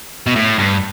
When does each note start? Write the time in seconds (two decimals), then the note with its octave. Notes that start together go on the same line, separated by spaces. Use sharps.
0.26 B2
0.36 A2
0.58 G2